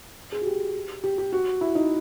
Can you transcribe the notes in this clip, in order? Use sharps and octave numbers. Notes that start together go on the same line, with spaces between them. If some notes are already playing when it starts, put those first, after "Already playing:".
G#4
F#4
G4
G4
G4
F#4
E4
D#4